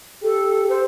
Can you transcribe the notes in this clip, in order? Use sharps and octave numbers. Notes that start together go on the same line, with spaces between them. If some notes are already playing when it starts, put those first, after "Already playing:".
G4 A4
C5